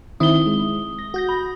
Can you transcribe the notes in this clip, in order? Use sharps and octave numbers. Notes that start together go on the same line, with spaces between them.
D#3 C4 E4 D#6 G7
G#3
A#6
F#4 G6 A#6
B5